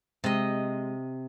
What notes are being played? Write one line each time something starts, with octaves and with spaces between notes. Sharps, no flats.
C3 G#3 D#5